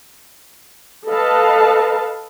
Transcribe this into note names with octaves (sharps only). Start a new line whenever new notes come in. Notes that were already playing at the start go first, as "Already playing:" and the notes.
A4 B4 D#5 F5 A5